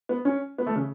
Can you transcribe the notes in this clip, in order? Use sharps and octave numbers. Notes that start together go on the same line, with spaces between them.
B3
C#4
B3
A3
C#3